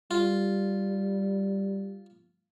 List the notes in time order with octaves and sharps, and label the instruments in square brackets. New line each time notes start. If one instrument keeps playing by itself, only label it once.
[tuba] G3 [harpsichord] F4